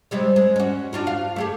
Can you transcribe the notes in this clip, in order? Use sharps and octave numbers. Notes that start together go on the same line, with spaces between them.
C3 G3 G#3
G#3
C#4 F#4
D4 F4 F#4
F5
A3 G4 G#4